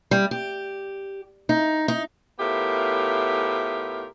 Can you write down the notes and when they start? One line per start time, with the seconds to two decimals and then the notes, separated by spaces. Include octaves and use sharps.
0.11 G3
0.31 G4
1.49 D#4
1.88 D#4
2.40 A2 B3 F4 G4 A#4 E5